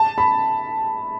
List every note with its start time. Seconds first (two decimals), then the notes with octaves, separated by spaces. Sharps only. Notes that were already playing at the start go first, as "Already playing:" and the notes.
Already playing: A5
0.18 B5